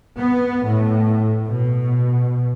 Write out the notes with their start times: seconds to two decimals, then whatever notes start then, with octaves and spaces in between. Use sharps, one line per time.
0.17 B3
0.66 A2
1.47 B2